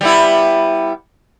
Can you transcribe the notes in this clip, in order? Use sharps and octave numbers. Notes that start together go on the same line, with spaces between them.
G3 B3 E4